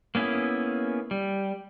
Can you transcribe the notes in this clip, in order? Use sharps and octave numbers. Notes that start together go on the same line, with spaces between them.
A#3 B3 C#4 E4 G#4
G3